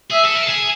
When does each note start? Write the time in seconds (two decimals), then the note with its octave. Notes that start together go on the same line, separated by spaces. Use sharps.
0.11 G#4 E5
0.24 A4
0.36 A#4
0.43 A4
0.48 G#4